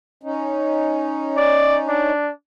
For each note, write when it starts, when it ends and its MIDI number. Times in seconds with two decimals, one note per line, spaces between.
0.23 2.12 61
0.23 2.12 63
1.37 1.77 74
1.89 2.31 62